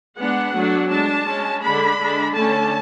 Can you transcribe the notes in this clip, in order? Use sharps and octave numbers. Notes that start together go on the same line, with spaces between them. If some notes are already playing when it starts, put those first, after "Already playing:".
G#3 B3 D4 F#5
F#3 A3 D4
G#3 D4 A5
G#3 C#4
D3 G#3 D4 B5
D3 G#3 D4
D3 A3 C#4 A5